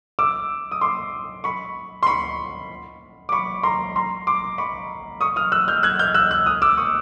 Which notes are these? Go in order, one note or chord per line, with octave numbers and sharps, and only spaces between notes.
D6 E6
D#6
C6 D6
B5 C#6
C6
B5 C#6
D6
B5 C#6
A#5 C6
A#5 C6
C6 D6
B5 C#6
C#6 D#6
D#6 F6
E6 F#6
F6 G6
F#6 G#6
F6 G6
E6 F#6
E6 F#6
D#6 F6
D6 E6
C#6 D#6